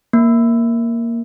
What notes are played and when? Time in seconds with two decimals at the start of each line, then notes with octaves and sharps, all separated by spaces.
0.13 A#3